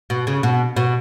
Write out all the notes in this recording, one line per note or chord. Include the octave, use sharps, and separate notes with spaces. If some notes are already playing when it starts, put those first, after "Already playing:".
B2
C#3
B2
B2